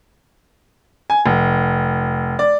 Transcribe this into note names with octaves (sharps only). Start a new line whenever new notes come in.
G#5
F1
D5